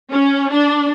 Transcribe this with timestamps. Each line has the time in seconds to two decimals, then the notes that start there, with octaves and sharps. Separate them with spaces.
0.11 C#4
0.50 D4